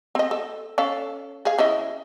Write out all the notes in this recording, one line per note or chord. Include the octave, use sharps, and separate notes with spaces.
C4 D#5
A4
C#4 A4 F5
G#4 F5
C#3 E4 D#5